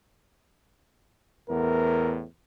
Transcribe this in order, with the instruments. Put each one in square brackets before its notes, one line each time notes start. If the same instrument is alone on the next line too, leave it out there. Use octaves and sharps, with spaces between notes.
[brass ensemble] E2 A2 B3 [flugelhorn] A#4